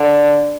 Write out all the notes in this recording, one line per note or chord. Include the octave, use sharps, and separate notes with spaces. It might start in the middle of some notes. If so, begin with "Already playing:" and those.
Already playing: D3